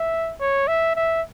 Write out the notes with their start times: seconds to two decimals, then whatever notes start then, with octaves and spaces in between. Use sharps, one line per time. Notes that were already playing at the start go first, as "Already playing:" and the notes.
Already playing: E5
0.40 C#5
0.68 E5
0.96 E5